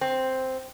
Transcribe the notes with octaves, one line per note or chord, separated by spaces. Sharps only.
C4